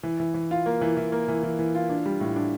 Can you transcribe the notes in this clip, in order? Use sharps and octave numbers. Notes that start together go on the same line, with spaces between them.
E3
E3
E3
F4
A#3
E3
E3
A#3
E3
E3
E3
F4
D4
G3
A2
D4